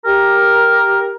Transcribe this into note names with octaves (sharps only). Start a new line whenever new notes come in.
G4 A#4